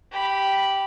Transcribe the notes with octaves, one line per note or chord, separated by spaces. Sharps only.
G4 B5